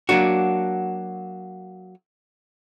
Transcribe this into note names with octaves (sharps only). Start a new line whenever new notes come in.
F#3 A#3 D4 F#4